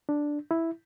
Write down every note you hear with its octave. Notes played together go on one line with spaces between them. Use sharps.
D4
E4